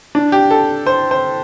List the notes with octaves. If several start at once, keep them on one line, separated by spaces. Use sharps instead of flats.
D4
G4
A4
C5
C5